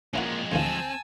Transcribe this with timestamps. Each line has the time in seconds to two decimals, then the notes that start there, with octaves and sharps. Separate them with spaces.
0.14 F2 A#2 G#3 A#3 C#4 E4 F#4
0.52 D2 E3 C4 F4 G#5 A5 E6